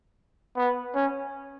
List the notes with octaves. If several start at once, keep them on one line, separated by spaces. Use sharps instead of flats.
B3
C#4